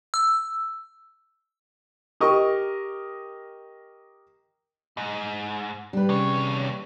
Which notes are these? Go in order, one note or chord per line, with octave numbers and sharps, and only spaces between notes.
E6
G4 A#4 D#5 C#6
G#2 D#5
G3 D4 B4
D#2 C3 C#4 G#4 C#5